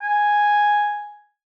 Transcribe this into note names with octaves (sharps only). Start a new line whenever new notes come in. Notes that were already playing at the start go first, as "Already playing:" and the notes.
G#5